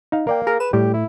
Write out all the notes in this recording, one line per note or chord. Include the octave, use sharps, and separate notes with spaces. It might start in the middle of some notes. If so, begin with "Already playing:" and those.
D#4 F5
A#3 A#4 D5 G5
G#4 A#4
B4 E7
A2 G3 G4
E4